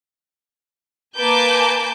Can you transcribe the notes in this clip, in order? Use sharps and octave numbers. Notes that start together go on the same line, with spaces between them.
A#3 B4 G#5 A5 D6 G6